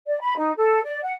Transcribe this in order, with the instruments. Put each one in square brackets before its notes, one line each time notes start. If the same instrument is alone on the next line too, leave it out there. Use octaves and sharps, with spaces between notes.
[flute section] D5
B5
D#4
A4
D5
F#5